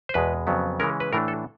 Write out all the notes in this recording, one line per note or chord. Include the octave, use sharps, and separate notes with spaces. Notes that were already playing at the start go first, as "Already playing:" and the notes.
C5
E2 B2 G#3 B4
F2 C#3 F#3 B3
C#3 E3 G#3 C#4 A#4
B4
A2 E3 A3 D4 A#4
A4